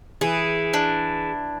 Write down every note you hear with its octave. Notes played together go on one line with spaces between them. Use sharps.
E3 G#4
D4